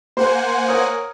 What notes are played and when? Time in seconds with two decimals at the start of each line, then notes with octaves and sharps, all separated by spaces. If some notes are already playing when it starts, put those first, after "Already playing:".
0.17 A#3 C5 F#5 G#5
0.69 A#4 C#5 D#6